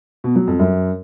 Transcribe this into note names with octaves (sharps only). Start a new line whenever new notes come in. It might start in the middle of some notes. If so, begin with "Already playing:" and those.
B2
F#3
F2
F#2